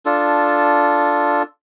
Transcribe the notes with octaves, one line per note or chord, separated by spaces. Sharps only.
D4 F4 A4